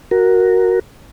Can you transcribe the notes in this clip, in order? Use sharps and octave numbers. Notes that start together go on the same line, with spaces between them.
F#4 A#4